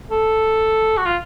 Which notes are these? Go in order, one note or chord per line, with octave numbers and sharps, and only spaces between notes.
A4
F#4
F4